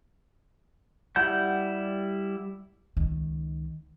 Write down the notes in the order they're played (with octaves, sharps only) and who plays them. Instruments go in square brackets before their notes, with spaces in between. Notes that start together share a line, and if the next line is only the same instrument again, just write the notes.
[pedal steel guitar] G3 E4 F#5 G6
[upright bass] C#2 D#3